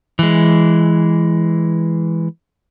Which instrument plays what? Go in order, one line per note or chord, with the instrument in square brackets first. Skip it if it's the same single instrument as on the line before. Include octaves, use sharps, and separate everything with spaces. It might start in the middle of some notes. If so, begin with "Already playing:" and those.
[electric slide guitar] E3 G#3